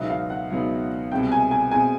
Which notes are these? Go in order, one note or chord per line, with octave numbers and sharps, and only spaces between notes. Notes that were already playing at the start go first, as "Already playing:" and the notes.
Already playing: C#2 B2 F#3 B3 D#4 E5
F5
F#5
C#2 B2 F#3 B3 D#4
C2 B2 G#3 C4 G5
G#5
G#5
B2 G#3 C4 G#5